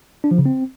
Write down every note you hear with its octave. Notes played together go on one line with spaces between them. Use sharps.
D4
F3
C#3
C4